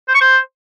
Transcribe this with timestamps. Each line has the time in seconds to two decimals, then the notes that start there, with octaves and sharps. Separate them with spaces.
0.08 C5
0.15 C#6
0.21 C5